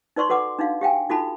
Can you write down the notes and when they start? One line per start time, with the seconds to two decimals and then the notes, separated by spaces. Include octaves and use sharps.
0.16 D#4 B4 D5 C6 C#6
0.29 F#4 A4 B4 F#5 D6
0.59 D4 D#4 F#4 F5
0.81 G4 F5 G5 G#5
1.09 D#4 F4 F#4 A4 A5 B5